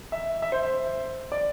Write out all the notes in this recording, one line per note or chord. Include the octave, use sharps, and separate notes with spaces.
E5
E5
C5
E5
D5